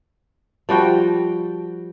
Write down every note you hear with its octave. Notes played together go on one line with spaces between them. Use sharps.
F3 G3 F#4 G5